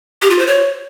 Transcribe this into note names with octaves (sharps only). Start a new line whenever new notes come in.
G4
F4
C5
C#5